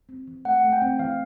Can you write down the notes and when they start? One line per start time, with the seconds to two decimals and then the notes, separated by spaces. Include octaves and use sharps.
0.09 C4
0.27 E3
0.45 A3 F#5
0.64 A3
0.73 G5
0.82 C4
0.99 E3 F5